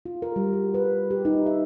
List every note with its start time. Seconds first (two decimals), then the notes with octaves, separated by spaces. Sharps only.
0.06 F4
0.22 A#4
0.36 G3
0.53 F#4
0.74 B4
1.11 G4
1.25 D#4
1.46 E5